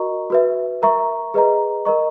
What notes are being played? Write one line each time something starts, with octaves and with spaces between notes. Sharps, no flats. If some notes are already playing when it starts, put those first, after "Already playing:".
Already playing: F#4 A#4 D#5 A#5 C#6
F#4 B4 E5
A#4 E5 A#5 C#6
G#4 B4 D#5 A#5
A#4 D#5 A#5 C#6